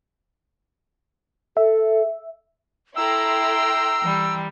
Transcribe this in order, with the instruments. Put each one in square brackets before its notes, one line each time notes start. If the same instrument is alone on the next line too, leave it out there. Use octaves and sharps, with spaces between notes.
[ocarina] A4 [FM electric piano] E5
[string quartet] E4 A4 [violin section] G5 A#5 C6 [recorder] E6
[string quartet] E3 G3